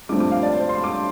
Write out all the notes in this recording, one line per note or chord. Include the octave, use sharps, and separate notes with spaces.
G2 F3 A3 C4 D6
D6
F5
D5
C5
C6
D6